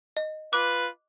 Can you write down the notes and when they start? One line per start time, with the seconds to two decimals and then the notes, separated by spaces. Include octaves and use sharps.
0.17 D#5
0.53 F4 B4 D6 F#6